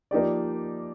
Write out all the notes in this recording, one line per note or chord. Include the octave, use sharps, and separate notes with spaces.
F3 A#3 D#4 G4 D5